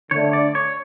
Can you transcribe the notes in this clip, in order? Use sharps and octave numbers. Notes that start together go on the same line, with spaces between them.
D3 A3 D4 C#5
D5
C#5